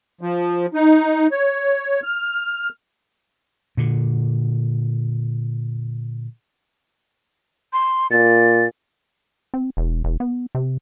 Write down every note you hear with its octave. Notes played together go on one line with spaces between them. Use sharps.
F3
D#4
C#5
F6
A#2 D3
C6
A#2 A6
C4
E1
E1
B3
C3